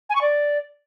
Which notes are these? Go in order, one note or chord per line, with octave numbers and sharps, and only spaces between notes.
G#5
C#6
D5